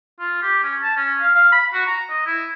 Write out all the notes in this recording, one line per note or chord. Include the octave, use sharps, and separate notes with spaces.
F4
G4
C#4
A5
C#4
F5
F5
B5
F#4
A#5
D#5
E4